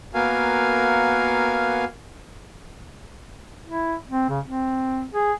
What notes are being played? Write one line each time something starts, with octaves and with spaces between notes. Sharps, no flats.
A#3 B3 F#4 A#4 F5 G#5
E4
C4
C#3
C4
G#4